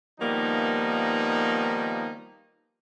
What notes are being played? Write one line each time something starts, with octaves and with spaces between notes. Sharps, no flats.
D#3 F3 G3 A#3 B3 D#4